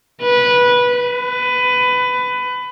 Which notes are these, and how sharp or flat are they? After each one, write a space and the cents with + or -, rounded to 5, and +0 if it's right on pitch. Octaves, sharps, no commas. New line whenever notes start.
B4 -15
B4 +20